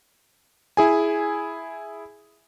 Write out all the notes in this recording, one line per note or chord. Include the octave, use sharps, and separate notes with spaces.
E4 G#4 G#5